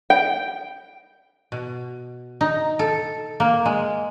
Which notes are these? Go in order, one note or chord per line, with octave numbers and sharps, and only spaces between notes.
G5
B2
D#4
A4
A#3
G#3